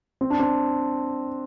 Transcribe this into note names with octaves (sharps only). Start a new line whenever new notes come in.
C4
D4
C4